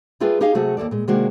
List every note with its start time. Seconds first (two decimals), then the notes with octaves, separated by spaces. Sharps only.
0.20 G3 A3 F4 G#4 B4 G5
0.41 D#4 G4 G#4 D#5 F5
0.55 C3 F#3 A3 F#4 G#4
0.77 D#2 A#3 A4 D5
0.91 A#2 G#3
1.08 C3 D#3 G#3 A#3 D4 F#4